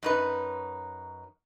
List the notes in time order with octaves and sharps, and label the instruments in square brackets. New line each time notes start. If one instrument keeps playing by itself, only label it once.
[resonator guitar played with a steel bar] F#2 D#4 B4